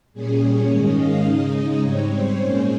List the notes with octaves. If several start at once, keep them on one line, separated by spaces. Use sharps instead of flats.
A#2 G3 C#4 G#4
C#5
G#2 D#3 G#3 C#4 D#5
F5
C#3 G#3 D#4 D#5
G#2 G3 C4 C#5
C5
A#2 G#3 C#4